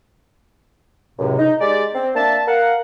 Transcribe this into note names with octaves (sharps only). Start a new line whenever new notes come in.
C#2 F#2 A2 C3
D#4
G#3 D#4 G4 D5
C4
A#3 D4 E5 A5
A#4 F5 F#5